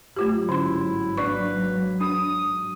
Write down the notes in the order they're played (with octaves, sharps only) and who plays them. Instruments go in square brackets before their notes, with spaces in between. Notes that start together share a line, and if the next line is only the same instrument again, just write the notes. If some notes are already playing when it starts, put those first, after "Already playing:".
[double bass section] G#1 F#3 [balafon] A3 F4 G4
[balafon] D3 C#4 C6 [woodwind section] E4
[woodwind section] A#3 B4 [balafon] D4 D5 C#6
[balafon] D4 [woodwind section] D#6